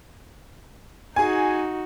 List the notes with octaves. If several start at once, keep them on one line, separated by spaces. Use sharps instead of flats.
D#4 F#4 G#4 G#5